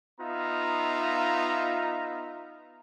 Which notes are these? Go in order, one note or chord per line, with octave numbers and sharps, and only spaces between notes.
B3 D#4 F4 E5 F5 A#5